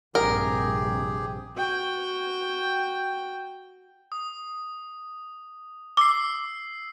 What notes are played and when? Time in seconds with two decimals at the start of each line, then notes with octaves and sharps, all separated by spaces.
0.15 A#1 G2 C3 G4 G#4 A#4
1.56 F#4 G5
4.12 D#6
5.97 D6 E6 C7